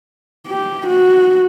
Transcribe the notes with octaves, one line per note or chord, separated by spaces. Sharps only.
G4
F#4